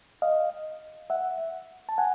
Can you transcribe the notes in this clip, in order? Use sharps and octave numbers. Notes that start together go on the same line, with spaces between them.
D#5 F5
E5 F#5
A5
F#5 G#5